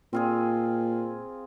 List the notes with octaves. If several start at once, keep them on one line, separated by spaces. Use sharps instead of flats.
A#2 C4 F4 G#4